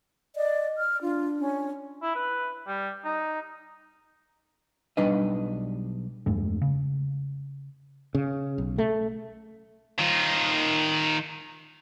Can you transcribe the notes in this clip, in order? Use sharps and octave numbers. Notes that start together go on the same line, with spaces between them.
D5 D#5
F6
D4 F4
C#4
E4
B4
G3
D#4
B1 G3 D4 D#4 B4 D#5
E2 G2 G#3 A3
C#3
C#3
B1
A3
D#3 F4